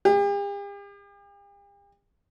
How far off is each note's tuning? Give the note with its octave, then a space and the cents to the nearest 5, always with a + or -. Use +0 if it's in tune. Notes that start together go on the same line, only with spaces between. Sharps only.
G4 +45